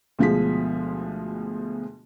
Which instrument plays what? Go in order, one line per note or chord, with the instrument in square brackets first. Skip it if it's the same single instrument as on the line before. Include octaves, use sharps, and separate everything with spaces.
[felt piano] D2 B2 F3 G#3 G#4 B6